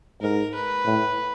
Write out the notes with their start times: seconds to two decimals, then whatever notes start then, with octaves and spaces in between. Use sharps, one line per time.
0.22 G#2 A#4
0.54 B4
0.86 A2